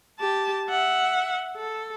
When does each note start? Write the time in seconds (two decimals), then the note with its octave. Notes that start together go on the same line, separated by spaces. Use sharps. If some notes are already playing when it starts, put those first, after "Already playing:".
0.19 G4 A5
0.69 E5 F#5
1.56 A4